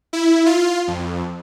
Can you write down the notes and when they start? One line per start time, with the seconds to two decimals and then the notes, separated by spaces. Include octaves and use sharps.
0.13 E4
0.46 F4
0.88 F2